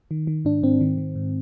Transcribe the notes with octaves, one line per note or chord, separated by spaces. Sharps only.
D#3
D#3
G#2 D4
G#2 C4
D#3
D#3
G#2